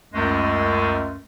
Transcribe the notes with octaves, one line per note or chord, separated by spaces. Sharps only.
C#2 F#2 G#3 A3